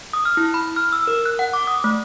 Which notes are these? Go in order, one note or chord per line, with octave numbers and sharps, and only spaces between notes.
D#6
F6
E4
B5
F6
E6
A#4
F#6
F#5
D6
D#6
A3